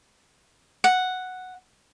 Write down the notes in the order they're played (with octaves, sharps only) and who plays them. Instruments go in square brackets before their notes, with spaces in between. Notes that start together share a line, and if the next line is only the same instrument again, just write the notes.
[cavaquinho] F#5